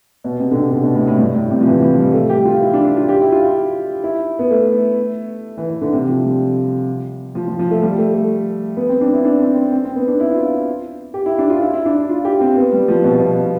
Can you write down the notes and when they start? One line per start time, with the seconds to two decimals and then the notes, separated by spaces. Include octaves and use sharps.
0.24 B2
0.40 C3
0.51 D3
0.56 C3
0.71 D3
0.83 B2
0.95 A2
1.07 A2
1.19 G2
1.35 A2
1.50 C3
1.61 F3
1.66 E3
1.82 F3
1.98 G3
2.13 A3
2.30 G4
2.45 F4
2.62 E4
2.73 D4
2.85 D4
2.97 F4
3.09 G4
3.21 E4
3.32 F4
3.44 F4
4.04 E4
4.39 B3
4.51 A3
5.57 E3
5.69 E3
5.81 D3
5.93 C3
6.08 F3
6.25 G3
7.35 F3
7.47 F3
7.59 F3
7.71 A3
7.83 G3
7.99 A3
8.14 A3
8.77 B3
8.89 C4
9.01 D4
9.13 E4
9.25 D4
9.41 C4
9.57 C4
9.72 C4
9.84 C4
9.96 B3
10.08 D4
10.20 E4
10.35 F4
11.14 G4
11.26 E4
11.39 D4
11.50 F4
11.62 E4
11.73 E4
11.86 D4
11.97 E4
12.09 F4
12.25 G4
12.41 C4
12.57 B3
12.73 G3
12.88 F3
13.04 B2
13.20 B2